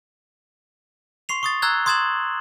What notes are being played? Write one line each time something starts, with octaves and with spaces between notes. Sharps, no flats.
C6 C#6 C7 F7
C#6 D#6 A6
A#5 E6 F#6 G#6 G7
C6 D#6 G#6 A6 E7 F#7